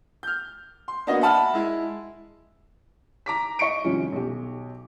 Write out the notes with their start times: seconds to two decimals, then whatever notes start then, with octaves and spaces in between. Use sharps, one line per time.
0.23 F6 G6
0.88 C6
1.07 A#3 B3 D4 F#4 D#5
1.21 E5 F#5 A5 B5 F6
1.53 G#3 E4
3.26 A#5 D6 B6
3.59 D#5 C#6 C#7 D7
3.84 C2 D#3 F3 C#4
4.12 B1 G4